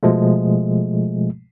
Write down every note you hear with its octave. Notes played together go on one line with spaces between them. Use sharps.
B2 F3 G#3 A3